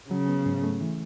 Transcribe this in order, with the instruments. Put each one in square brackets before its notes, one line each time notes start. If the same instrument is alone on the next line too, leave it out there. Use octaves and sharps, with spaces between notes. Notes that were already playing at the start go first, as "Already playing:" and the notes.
[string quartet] C#3 [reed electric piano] F#3
[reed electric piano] B3
G#2
A3
E3